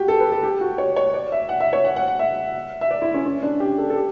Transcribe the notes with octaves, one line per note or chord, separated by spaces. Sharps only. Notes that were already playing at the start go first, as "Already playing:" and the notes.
Already playing: F#4 G4
A4
B4
A4
G4
F#4
C#5
C#5
D5
E5
F#5
E5
C#5
F#5
F#5
F#5
E5
E5
D5
E4
C#4
C#4
D4
G4
A4
A4
G4